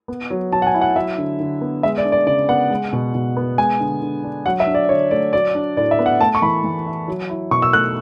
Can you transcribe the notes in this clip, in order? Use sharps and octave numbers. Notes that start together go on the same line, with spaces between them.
B3
F#3
F#3 A5
F#5
G#5
E4
F#5
F#3 E5
D3
D3
B3
G#3 E5
D5
D4
D5
C#3 D5
B3 F#5
G#3
B2
B2
B3
G#3 G#5
D3
D3
D4
F#3 F#5
E5
D4
D5
D3 C#5
A3 D5
F#3 D5
D4
A2 D5
E5
B3
F#5
A3 A5
C#6
E3 B5
E3
E4
F#3
E4
B2 C#6
E6
A3 F#6